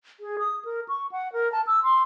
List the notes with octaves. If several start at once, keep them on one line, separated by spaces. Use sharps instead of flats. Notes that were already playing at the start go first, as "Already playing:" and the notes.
G#4
D#6
A#4
C#6
F#5
A#4
A5
E6
C6